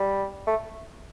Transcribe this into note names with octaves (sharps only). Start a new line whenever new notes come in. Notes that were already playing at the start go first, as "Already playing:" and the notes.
Already playing: G3
A3